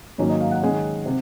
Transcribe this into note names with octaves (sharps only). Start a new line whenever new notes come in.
G#2 D#3 F#3 A#3 C#4 C#5
D#5
F5
F#5
D#3 G#3 C#4
C3